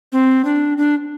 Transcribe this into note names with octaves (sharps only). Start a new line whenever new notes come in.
C4
D4
D4